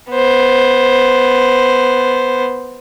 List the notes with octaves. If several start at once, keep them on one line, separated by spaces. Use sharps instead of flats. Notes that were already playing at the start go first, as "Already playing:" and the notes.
B3 C5